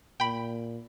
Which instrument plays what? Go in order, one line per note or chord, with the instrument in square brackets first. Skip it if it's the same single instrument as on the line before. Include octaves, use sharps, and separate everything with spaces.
[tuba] A#2 [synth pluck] G5 B5